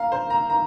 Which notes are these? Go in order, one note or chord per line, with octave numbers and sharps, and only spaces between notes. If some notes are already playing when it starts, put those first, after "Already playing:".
Already playing: F5 A#5
C5
A#5
A#5